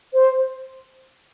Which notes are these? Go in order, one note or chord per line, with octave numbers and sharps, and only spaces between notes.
C5